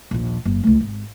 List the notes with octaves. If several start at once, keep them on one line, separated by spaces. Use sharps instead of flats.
A#1 D#2
F#1
C#2 A3
G#1